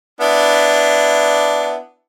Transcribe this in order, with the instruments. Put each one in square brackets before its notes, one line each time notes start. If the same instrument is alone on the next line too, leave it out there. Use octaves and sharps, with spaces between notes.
[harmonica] B3 D4 E4